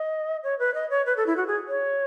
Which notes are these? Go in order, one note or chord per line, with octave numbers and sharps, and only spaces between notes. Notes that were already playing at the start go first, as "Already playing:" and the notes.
Already playing: D#5
C#5
B4
D#5
C#5
B4
A4
E4
F#4
G#4
C#5